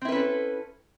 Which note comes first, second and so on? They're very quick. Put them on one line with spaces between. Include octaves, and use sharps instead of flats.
C4 E4 B4 C#4 A4